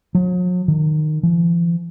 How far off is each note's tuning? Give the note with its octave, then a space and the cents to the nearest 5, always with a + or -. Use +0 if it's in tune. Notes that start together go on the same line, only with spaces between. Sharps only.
F#3 -45
D#3 -20
F3 -45